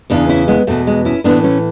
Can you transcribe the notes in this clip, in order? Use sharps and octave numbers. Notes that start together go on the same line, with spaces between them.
E2 C#3 E3 B3 D4
C#4 E4
G#3 B3
E2 B2 A3
G#3
C#4 E4
A2 E3 B3 D4
A3 C#4